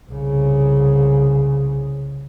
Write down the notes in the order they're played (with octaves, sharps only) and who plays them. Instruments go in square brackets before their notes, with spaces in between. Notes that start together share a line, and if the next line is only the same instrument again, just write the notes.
[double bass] C2 C#3